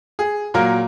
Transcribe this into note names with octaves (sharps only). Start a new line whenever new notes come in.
G#4
A#2 F#3 A#3 A#4